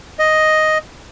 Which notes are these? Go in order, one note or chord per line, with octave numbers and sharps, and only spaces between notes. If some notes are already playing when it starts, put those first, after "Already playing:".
D#5